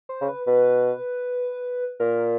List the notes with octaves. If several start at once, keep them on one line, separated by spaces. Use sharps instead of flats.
C5
C#3
B4
B2 B4
A#2 A#4